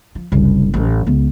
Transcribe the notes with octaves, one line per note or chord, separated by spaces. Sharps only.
F3
F#1 C2
A1 F#2
C#2 B3